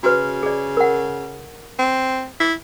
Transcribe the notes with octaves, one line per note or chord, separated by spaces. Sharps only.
C#3 F#4 B4
G#4 D5
A#4 F#5
C4
E4